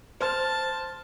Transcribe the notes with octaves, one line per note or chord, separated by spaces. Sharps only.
C5 A5 F6